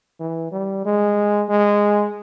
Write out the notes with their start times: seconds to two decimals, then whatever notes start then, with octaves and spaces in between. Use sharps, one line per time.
0.20 E3
0.52 G3
0.85 G#3
1.49 G#3